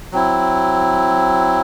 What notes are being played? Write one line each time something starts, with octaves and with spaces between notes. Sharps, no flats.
F#3 C4 E4